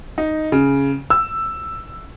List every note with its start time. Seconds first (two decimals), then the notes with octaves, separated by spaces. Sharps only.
0.18 D#4
0.52 C#3
1.10 E6